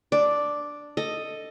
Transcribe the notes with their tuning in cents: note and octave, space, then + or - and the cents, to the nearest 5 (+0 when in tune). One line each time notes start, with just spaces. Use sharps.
D4 +0 D5 +0
A4 +10 D#5 +0